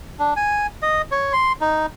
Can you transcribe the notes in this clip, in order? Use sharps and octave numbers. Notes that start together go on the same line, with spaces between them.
D4
G#5
D#5
C#5
C6
D#4